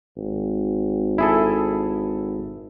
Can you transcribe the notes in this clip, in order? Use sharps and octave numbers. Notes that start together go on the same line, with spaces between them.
G#1
E4 G#4 A4